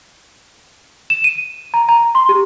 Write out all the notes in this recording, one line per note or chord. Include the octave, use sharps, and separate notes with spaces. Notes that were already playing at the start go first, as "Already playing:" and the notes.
E7
D#7
A#5
A#5
C6
G4